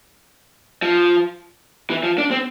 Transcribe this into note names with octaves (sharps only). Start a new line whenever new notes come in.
F3
E3
F3
D4
C4